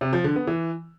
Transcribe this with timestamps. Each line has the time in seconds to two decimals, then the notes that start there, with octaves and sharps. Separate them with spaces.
0.01 C3
0.13 F3
0.24 D3
0.36 B3
0.47 E3